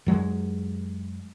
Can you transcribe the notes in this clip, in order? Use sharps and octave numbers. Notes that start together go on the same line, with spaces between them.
F#2 F#3 G#3